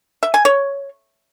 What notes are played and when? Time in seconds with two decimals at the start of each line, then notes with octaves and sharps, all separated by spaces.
0.23 E5
0.34 G#5
0.45 C#5